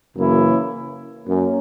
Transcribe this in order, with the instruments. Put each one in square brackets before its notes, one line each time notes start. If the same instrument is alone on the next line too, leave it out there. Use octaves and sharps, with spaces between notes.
[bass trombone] F#2 [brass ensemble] C#3 E3 A#3 C#4 E4
[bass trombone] F#2 [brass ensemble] A#3 C#4